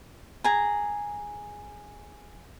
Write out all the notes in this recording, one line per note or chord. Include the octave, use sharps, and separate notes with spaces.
G#4 A#5